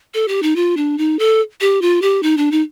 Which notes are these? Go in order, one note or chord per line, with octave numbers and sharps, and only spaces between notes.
A4
G4
D#4
F4
D4
D#4
A4
G4
F4
G4
D#4
D4
D#4